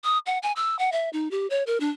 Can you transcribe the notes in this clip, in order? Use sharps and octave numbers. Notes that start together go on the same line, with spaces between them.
D#6
F#5
G#5
E6
F#5
E5
D#4
G4
C#5
A#4
D4